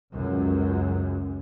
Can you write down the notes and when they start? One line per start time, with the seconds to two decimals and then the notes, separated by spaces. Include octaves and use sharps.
0.12 C#2 F#2